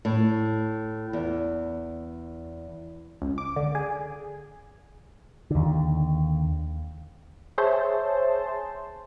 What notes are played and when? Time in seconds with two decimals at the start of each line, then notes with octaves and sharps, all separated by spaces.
0.05 A2
1.13 E2
3.22 C#2
3.38 D6
3.56 D3
3.75 G#4
5.51 D#2 D3
7.58 G#4 C5 C#5 E5 A5